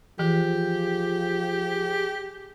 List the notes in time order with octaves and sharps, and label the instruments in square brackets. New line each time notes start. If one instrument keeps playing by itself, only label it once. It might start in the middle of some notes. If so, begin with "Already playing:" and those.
[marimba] E3 [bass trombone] F3 [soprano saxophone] G4 [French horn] G#4